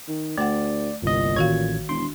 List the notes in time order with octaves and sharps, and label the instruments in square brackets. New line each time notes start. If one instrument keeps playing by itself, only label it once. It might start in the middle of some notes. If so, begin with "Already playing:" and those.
[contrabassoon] D#3
[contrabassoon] D2 [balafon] A3 F#5 [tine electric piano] D5
[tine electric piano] G1 C2 D#5 [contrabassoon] A#2
[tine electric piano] A1 G#6 [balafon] D#3 F#4 F5
[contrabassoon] E1 [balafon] D4 [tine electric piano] C6